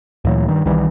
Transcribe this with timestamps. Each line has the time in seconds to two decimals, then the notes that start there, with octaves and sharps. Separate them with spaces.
0.25 D2 A#2 E3 F#3
0.48 G2 D#3
0.65 C2 D#3 E3 G3